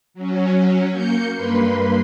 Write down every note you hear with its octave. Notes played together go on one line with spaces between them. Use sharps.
F#3 C#4
A#3 G6 C#7
G2 A#3 B4 B5 C6